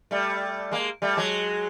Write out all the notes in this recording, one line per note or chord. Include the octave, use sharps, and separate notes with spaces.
G3 A3
G#3 A#3
G3 A3
F#3 G#3